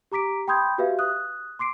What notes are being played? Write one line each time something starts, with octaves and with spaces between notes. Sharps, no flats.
G4 A#5 D6 B6 D7
G5 B5 C6 D#6 G6 G#6
F#4 G4 B4 E5 F5
D#6 F#6
C6 D6 C7 D7